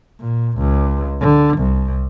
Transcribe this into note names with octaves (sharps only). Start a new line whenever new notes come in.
A#2
C#2
D3
C2